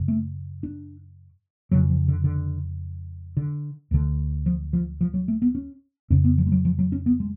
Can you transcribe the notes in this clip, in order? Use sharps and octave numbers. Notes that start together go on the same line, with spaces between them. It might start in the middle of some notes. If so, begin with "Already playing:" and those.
Already playing: F#2 C#3
A3
D4
F2 C#3 F#3
F3
D3
D3
D3
D2 D3
F3
F3
F3
F#3
A3
B3
C#4
F2 C#3 C#4
B3
F3
G#3
F#3
F3
F#3
C#4
B3
G#3